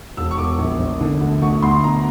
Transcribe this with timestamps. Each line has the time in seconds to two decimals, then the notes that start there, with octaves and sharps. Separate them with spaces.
0.17 E1 E6
0.31 C#6
0.38 E1 D6
0.58 A#1
0.79 A#1
1.01 D3
1.21 D2
1.42 D2 C#6
1.62 D2 C6
1.83 B2 A#5